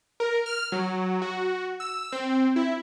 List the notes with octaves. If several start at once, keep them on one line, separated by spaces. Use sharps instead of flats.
A#4
F6
F#3
F#4
E6
C4
E4